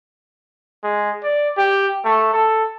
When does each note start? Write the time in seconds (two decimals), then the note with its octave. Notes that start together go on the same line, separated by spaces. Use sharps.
0.83 G#3
1.24 D5
1.58 G4
2.04 A3
2.34 A4